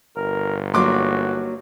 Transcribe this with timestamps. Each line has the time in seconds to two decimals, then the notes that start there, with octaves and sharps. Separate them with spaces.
0.16 G1 A#4
0.74 F#3 A#3 D#4 F#4 C6 D6